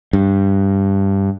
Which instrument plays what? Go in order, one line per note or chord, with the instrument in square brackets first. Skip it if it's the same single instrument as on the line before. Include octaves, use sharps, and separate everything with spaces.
[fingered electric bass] G2